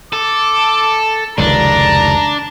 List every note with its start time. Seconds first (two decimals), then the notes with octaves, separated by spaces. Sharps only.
0.13 A4 D6
1.38 F1 C#2 D#3 D4 A#5